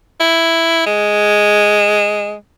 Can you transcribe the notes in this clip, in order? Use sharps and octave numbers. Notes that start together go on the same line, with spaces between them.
E4
G#3